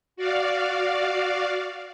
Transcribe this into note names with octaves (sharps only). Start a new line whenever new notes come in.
F#4 D5 F5